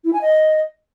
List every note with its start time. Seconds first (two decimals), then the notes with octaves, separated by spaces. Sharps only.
0.04 E4
0.13 G#5
0.22 D#5